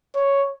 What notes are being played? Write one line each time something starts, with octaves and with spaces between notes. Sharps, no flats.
C#5